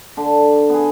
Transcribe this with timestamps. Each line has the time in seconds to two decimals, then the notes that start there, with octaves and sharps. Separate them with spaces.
0.17 D3 A5
0.69 B3 G#4